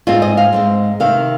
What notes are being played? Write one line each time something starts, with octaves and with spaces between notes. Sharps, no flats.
G#2 G#3 C4 F4
D#5
F5
G#2 G#3 C4
C3 D#3 C4 F5